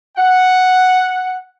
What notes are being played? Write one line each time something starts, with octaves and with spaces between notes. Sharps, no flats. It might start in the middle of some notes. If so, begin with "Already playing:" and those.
F#5